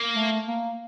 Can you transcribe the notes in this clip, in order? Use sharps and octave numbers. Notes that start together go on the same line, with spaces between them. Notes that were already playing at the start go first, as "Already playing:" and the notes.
Already playing: A#3
A3
A#3